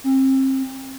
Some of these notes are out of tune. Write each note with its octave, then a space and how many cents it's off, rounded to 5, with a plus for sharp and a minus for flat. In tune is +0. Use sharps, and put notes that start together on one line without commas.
C4 +30